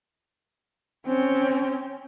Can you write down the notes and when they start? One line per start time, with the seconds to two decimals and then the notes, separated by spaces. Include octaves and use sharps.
1.07 C4 C#4